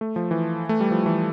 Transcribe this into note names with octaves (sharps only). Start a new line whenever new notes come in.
A3
F3
E3
A3
G3
F3
E3